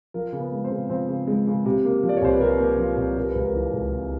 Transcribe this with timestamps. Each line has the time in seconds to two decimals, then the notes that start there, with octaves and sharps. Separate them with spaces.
0.14 F3 A#4
0.33 C#3
0.39 B3 B4
0.52 G#3
0.64 C4 C5
0.70 C#3
0.90 F3 C4 C5
1.09 C#3
1.27 G#3
1.47 C#3
1.66 C3
1.85 A#3
2.04 F3
2.09 D5
2.17 C#5
2.22 C2 C5
2.33 B4
2.40 C3 A#4
2.59 A#3
2.79 F3
2.97 C2
3.17 C3 A#4
3.30 C#2 B4
3.44 A#4
3.54 E3
3.73 C#2
3.92 C3